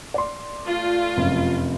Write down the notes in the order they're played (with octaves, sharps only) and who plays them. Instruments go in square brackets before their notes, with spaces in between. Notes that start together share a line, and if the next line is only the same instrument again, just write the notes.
[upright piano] D5 C6
[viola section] A3 F4
[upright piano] F1 F#2